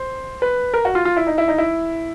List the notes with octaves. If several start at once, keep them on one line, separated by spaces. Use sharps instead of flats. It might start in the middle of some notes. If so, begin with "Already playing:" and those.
Already playing: C5
B4
A#4
F#4
F4
F4
E4
D#4
E4
D#4
E4